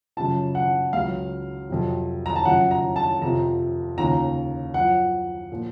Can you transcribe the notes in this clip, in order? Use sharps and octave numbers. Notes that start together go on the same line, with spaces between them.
F#2 C#3 F3 A5
F#5
C#2 C#3 F#3 F5
F2 C3 F#3
A#5
A5
F#2 C#3 F3 F#5
A#5
A5
F2 C3 F3 A#5
D#2 C#3 F3 A#5
F#2 F3 F#5
A#2 F3